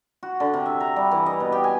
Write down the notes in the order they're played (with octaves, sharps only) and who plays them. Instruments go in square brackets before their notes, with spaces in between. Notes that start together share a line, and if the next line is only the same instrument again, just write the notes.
[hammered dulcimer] F#4
D3
C3
E5
A#5
G3
E3
D#5
B2
G4
G#5